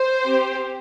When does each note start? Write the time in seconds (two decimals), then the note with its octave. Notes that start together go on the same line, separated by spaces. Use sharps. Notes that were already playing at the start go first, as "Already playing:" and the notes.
Already playing: C5
0.24 C4 G4